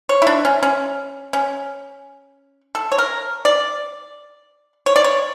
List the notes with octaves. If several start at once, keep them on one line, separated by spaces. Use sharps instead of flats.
C#5
E4
D4
C#4
C#4
C#4
A4
C#5
A#4
D5
C#5
D5
C#5